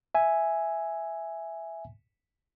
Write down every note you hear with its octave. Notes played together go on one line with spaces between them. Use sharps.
E5 G#5